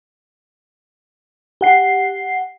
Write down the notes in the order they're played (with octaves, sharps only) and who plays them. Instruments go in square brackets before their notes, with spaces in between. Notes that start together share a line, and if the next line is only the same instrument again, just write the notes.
[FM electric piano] G4 F#5 C7